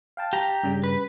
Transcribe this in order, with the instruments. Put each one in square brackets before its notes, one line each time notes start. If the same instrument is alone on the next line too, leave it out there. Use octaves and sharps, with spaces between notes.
[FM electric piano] F5 G5 A5
[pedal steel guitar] G4 A#5
[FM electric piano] G2 C#3 G3
[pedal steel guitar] B4